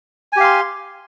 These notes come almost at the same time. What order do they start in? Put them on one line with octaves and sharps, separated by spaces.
G#5 G4 F5 C6